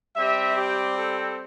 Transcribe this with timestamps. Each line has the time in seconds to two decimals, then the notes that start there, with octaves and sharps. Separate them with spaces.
0.15 G3 C4 G4 E5
0.56 G4
0.97 A4